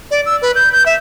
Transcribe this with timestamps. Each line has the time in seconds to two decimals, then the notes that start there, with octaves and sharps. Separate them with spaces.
0.11 D5
0.26 E6
0.42 B4
0.55 G6
0.73 G6
0.86 E5